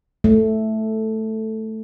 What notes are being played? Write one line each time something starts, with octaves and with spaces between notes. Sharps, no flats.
A3